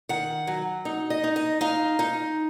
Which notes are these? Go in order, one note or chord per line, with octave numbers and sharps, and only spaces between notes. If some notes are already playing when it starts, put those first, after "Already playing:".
D#3 F#5
F#3
D#4
D#5
D#4
D#5
D#4 F5
D#4